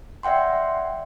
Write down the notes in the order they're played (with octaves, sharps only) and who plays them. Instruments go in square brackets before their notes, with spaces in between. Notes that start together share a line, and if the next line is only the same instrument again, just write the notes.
[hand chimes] D5 E5 F#5 G5 C6